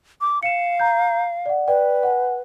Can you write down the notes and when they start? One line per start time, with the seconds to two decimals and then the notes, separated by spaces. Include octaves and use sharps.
0.21 D6
0.43 F5 C#7 E7
0.79 A#5 G6
1.46 D5 F#5
1.68 B4 D5 G5
2.03 F#5 G#5